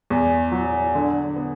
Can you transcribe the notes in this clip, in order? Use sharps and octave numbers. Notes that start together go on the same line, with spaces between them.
E2
F#3
D3
B3